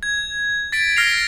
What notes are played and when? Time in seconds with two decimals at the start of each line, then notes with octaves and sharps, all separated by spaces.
0.03 G#6
0.72 A6 B6 D7
0.96 F6 A#6 C7 F7